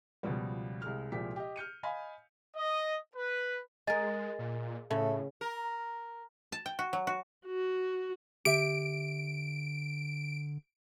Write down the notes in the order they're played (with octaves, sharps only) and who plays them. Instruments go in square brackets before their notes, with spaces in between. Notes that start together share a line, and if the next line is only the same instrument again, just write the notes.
[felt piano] C#2 B2 F3 G3
C2 G#3 F6
C2 A#2 F3 G#3 G4 B6
G4 D#5
F6 G6 C#7 D#7
D#5 F5 G#5 B5
[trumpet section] D#5
B4
[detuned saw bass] G#3 [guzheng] G#4 A#4 [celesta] D#5 G#5 A6
[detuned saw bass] A#2
[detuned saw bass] A2 [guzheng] C#3 [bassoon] A3
[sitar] A#4
[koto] A5
G5
F#4
F#3
F#4
[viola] F#4
[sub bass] D3 [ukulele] G4 E5 [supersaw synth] D7